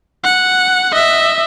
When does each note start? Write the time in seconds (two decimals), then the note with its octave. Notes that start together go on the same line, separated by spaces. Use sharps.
0.24 F#5
0.92 D#5 E5